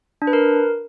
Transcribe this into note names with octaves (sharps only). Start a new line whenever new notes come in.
D4
B4
A#4